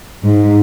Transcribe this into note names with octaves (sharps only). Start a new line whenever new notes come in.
G#2